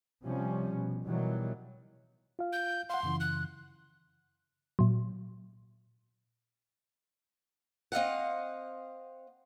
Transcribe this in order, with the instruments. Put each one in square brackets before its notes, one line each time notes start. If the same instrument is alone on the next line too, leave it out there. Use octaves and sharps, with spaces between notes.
[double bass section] C3 F3 G3 C#4
B2
B2 D#3 E3 F#3 G3
[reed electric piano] F4 F5
[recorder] G6
[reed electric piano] F5 F#5 [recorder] C6
[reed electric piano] F#2 C#3 E3
[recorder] F#6
[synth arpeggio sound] A#2 F#3
[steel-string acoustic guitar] C4 D#5 F5 F#5